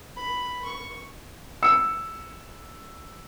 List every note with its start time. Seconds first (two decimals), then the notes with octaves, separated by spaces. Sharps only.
0.17 B5
0.65 C#6
1.63 E6 C#7